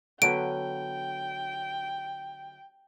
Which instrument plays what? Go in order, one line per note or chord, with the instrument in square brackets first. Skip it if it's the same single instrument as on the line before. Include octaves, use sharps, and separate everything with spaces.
[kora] D3 F#3 B3 [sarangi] G5 [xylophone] D7